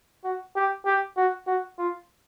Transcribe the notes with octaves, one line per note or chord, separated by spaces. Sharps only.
F#4
G4
G4
F#4
F#4
F4